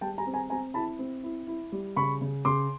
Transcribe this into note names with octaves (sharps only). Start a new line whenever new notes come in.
G3 G5 A5
G#5 A#5
C4
G#5 A#5
C4 G#5 A#5
E4 A5 B5
C4
E4
E4
G3
C#3 B5 C#6
C#3
C#3 C6 D6